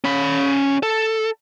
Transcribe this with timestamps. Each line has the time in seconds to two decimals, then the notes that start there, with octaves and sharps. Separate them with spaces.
0.04 C#4 B5
0.83 A4